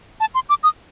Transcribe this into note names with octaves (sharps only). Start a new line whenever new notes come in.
A5
C6
D6
D#6